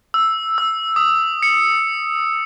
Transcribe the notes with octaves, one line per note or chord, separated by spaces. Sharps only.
E6
E6
D#6
C#7